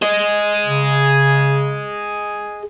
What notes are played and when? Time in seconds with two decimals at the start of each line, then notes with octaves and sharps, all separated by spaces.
0.02 G#4 D#5
0.66 C#3